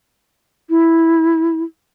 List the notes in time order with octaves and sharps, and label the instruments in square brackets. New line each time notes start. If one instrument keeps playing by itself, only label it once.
[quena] E4